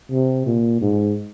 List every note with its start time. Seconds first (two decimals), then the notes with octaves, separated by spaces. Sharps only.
0.12 C3
0.46 A#2
0.81 G#2